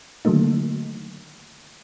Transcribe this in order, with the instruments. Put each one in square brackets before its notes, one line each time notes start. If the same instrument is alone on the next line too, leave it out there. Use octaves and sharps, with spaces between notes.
[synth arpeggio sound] D3 D#3 F#3 A3 A#3 D#4